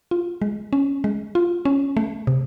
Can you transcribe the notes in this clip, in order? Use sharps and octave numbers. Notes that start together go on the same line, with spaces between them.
F4
G#3
C#4
G#3
F4
C#4
A3
C3